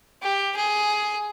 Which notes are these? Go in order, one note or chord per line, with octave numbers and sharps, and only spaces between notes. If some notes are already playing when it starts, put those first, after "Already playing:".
G4
G#4